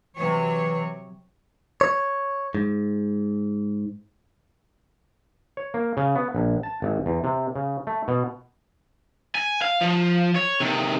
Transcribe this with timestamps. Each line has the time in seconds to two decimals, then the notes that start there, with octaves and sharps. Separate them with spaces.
0.16 C3 E3 F#3 C#5
1.81 C#5
2.55 G#2
5.57 C#5
5.74 A#3
5.97 C#3
6.16 B3
6.35 A#1
6.63 A5
6.82 G#1
7.06 E2
7.24 C3
7.56 C#3
7.87 A3
8.08 B2
9.35 G#5
9.62 F5
9.81 F3
10.36 C#5
10.60 C3 D#3